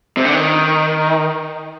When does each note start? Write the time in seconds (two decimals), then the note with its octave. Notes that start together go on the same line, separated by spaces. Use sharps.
0.17 C3
0.25 D3
0.33 D#3